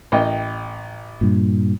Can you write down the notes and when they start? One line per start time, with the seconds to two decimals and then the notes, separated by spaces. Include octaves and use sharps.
0.12 A1 D#5 G5
1.21 G2 A#2